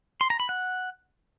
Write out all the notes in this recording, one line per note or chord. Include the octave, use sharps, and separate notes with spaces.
C6
A#5
B5
F#5